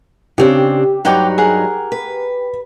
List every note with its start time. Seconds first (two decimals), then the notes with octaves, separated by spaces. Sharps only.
0.38 C#3 C4 D4 G4
1.05 G2 F#3 D#4 F#5 G5 D6
1.38 G#4 A#4 F#5
1.92 B4